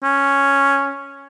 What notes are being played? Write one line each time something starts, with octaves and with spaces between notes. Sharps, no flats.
C#4